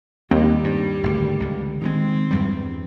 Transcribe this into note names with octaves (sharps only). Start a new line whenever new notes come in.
D#2 G3 C4
G2
G#1 D2
C#2 D3
D#3 E3 G#3 C4
E2 G2 G3